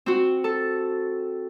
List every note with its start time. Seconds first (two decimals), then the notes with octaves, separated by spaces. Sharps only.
0.06 C4 F#4
0.44 A4